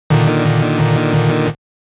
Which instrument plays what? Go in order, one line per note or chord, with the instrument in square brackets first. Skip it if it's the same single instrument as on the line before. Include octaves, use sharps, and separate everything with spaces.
[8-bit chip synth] A#2 D3 D#3